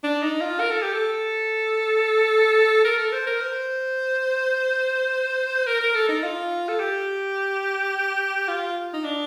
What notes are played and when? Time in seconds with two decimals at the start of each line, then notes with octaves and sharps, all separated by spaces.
0.03 D4
0.22 D#4
0.41 F4
0.60 A#4
0.71 A4
0.82 G4
0.93 A4
2.84 A#4
2.99 A4
3.12 C5
3.26 A#4
3.41 C5
5.67 A#4
5.80 A#4
5.95 A4
6.09 D#4
6.23 F4
6.69 A4
6.79 G4
8.48 F4
8.94 D#4
9.04 D4